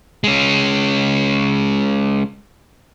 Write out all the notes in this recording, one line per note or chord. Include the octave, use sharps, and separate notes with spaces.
G#3 C#4